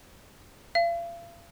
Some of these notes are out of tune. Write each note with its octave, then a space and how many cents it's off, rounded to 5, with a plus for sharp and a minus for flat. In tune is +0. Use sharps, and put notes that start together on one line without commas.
F5 -40